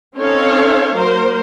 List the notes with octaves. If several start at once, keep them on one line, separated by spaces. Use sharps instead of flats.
C4 C#4 D#4 A4 C#5 F5
F#3 A#3 A#4 C5